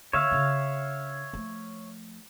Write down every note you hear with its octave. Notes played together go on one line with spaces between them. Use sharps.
D3 C#5 E5 F5
C#3 D4
F3 A3